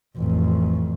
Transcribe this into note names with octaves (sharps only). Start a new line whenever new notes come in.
A1 F2